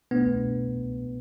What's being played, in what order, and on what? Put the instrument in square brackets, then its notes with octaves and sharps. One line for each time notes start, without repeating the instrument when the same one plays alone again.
[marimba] B2 A3 D4 [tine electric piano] B3